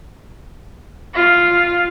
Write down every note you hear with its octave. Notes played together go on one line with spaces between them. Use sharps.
F4 F5